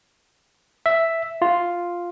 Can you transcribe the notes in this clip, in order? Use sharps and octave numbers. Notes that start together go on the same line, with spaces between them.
E5
F4